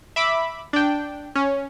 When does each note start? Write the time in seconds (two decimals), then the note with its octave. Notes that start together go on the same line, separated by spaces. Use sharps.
0.16 E5 B5 D6
0.73 D4 G5
1.35 C#4